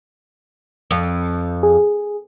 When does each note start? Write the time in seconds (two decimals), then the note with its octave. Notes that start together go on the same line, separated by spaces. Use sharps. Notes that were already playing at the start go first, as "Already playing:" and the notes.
0.91 F2
1.63 G#4